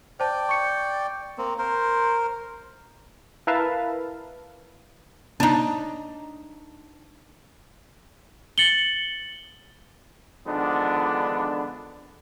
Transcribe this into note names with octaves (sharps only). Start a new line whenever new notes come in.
C5 D5 G5 A5
C#6 C#7
A#3 C4
A#4 C5
E4 A#4 B4 E5 F5 A5
D4 D#4
A6 C#7 F#7 G7
D3 D#3 F3 G#3 B3 D4